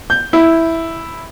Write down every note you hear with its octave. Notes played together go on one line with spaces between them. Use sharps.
G6
E4